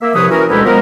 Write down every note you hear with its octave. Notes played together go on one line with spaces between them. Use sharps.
A#3 E5
C2 C3 F3 B4 C#5 D#6
E3 C#4 F#4 A#4
D2 B2 G#3 E4 G4 B4
F3 G#3 B3 A#4